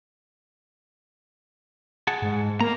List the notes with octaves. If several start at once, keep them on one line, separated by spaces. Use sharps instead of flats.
G#4 F#5 A5
G#2
A#3 A#5